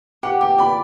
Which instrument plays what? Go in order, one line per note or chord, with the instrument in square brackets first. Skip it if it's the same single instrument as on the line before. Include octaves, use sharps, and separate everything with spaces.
[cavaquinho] G4 [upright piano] F#5
[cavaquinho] G4 [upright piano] G5
[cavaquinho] D5 [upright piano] B5